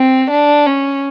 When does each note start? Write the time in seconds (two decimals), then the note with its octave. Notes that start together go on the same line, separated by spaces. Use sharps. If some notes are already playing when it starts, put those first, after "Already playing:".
Already playing: C4
0.30 D4
0.66 C#4